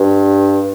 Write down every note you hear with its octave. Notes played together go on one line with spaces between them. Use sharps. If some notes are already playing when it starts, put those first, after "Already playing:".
Already playing: G2